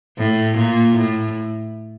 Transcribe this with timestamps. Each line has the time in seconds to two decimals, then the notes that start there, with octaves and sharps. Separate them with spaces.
0.18 A2
0.57 A#2
0.96 A2